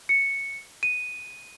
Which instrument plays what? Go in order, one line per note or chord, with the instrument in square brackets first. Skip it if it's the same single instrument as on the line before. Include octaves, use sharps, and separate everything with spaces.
[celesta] C#7
D#7